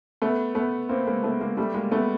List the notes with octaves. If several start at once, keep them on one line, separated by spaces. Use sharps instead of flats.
A3 B3
A3 B3
A#3 C4
G#3 A#3
A3 B3
G#3 A#3
G3 A3
G#3 A#3
A3 B3